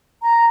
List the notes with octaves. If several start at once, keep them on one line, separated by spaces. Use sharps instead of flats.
A#5